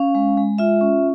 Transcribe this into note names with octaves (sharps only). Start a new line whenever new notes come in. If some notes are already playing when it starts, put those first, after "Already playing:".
Already playing: C#4 F5
G#3
G#3
F4 E5
C#4